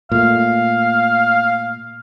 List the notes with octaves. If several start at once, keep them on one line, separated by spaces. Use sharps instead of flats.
A#2 A3 F5